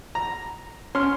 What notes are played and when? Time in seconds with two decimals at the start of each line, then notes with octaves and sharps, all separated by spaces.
0.15 A#5
0.95 C#4 C6 F6